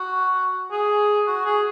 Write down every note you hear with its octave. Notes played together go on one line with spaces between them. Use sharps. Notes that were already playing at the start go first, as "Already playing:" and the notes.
Already playing: F#4
G#4
F#4
G#4